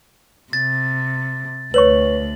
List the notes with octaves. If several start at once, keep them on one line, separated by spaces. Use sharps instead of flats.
C3 A6
D2 B4 C#5 C#6 F#7